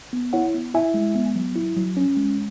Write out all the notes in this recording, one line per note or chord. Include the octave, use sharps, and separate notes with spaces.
B3
E4 C#5 F#5
B3
E4 E5 G#5
G#3
B3
F#3
E4
F#3
C#4
G#3